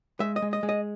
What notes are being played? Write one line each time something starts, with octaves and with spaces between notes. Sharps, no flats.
G#3 E5
D#5
G#3
D#5
G#3
D#5